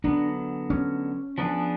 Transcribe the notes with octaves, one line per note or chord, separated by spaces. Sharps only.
D3 F#3 B3 D4
C#4
F3 B3 D4 G#4